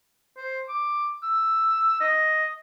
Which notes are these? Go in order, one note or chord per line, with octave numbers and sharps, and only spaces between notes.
C5
D6
E6
D#5